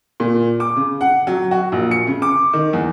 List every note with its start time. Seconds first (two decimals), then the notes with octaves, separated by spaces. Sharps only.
0.20 A#2
0.60 D6
0.77 C#3
1.01 F#5
1.27 F#3
1.51 F#4
1.72 A#1
1.91 C#7
2.07 C#3
2.22 D6
2.53 D#3
2.73 E2